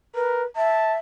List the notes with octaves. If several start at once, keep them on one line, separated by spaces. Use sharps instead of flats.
A#4 B4
E5 A5